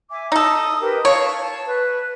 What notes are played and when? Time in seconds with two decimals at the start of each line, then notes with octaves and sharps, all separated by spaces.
0.09 E5 G#5 D6
0.32 D#4 A4 D#6
0.80 G4 A#4 B4
1.05 C#5 F5 A5 C#6
1.38 A5
1.66 B4